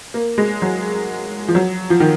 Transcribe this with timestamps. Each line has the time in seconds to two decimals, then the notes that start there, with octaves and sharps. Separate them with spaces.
0.14 A#3
0.38 G#3
0.62 F#3
1.48 F3
1.55 F#3
1.90 F3
2.00 D#3